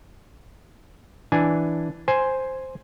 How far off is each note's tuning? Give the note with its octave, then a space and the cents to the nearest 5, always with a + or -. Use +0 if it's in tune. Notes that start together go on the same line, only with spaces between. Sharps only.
E3 +0 D4 +0 G#5 +0
C5 +0 G#5 +0